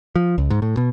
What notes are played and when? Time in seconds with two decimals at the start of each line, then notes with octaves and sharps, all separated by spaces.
0.16 F3
0.38 C#2
0.50 G#2
0.62 A2
0.77 B2